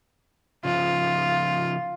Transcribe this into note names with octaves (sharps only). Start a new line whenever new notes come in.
C#3 F3 F4